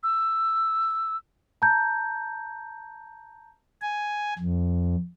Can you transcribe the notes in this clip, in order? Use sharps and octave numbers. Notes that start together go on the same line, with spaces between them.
E6
A5 A#5 G6
G#5
F2